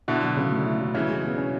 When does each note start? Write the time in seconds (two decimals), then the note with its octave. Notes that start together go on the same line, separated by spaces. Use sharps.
0.08 B2 D3 E4
0.22 F#3
0.37 C#3
0.51 A3
0.66 E4
0.81 F#3
0.95 C#3 E3 E4
1.09 G#3
1.24 B2
1.38 C#4